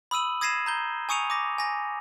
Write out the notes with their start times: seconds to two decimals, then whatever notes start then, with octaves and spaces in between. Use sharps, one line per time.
0.11 B5 D#6 E6 D#7 F#7
0.41 D#6 G#6 A#6 C7 D#7 E7
0.66 A#5 G6 G7
1.09 G#5 C#6 D#6 C#7 D#7 F7
1.30 D6 A#6
1.58 G#5 A#6